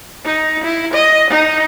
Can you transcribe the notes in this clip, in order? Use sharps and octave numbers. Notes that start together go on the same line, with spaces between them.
D#4
E4
D#5
D#4